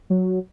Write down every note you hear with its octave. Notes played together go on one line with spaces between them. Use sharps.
F#3